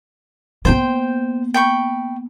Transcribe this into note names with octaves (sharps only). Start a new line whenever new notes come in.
A#3 B3 C5 G5
G5 B5 C#6